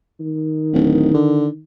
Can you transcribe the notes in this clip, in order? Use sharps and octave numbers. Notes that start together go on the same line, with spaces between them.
D#3
D1
D3